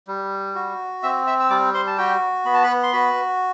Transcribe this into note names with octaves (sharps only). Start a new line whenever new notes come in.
G3
F#4
C4 E5 E6
E5 E6
E6
G3 D5 D6
C5 C6
A5
F#4 G4 G5
B3 B5
A5
B4 B5
C6
F#4 B4 B5